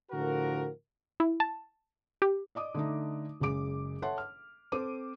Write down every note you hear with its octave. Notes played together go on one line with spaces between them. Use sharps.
A2 D3 F3 F#4 A#4
E4
A5
G4
D5 D#5 D6 D#6
D3 A3 D#4
F#1 C#3 G#3 G#4 D6 D7
A4 C#5 E5 F#5 A5 C6
F6
C4 A4 C5 D6 D#7